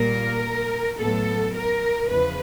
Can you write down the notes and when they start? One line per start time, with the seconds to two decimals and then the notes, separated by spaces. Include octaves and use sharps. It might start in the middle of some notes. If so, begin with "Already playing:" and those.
Already playing: A#2 G3 A#3 A#4
1.00 A2 F#3 B3 A4
1.55 A#4
2.09 E2 C#3 F3 B4